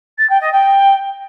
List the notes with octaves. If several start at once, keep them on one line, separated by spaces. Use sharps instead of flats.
A6
G5
D#5
G5